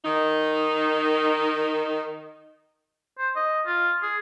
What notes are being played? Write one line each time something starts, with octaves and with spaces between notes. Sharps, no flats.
D#3 D#4
C5
D#5
F4
G#4